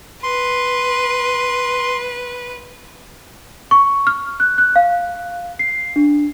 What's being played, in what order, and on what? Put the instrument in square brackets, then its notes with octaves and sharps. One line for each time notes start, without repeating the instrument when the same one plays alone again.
[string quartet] B4 [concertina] C6
[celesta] C#6
F6
F#6
F#6
F5
C7
D4